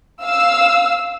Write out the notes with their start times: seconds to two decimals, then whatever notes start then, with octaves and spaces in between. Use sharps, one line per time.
0.23 F5 E6